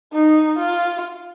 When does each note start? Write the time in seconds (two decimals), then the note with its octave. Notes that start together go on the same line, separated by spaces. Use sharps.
0.13 D#4
0.59 F4